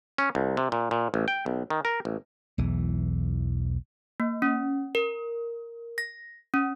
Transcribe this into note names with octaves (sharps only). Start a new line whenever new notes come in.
C#4
C2
C3
A#2
A#2
A1
G5
B1
D#3
A#4
A1
B1 E2 E3
A#3
C#4
A#4
A#6
C#4